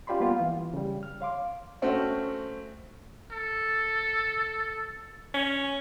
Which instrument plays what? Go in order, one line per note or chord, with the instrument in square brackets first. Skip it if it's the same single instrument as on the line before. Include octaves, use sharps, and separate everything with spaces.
[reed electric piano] C#4 F4 G4 D5 B5 C6
G3 A#3 B3 F4
E3
C#3 G3
F6
C#5 F5 C6 D6
[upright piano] A3 C4 C#4 F#4
[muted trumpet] A4
[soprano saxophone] C#4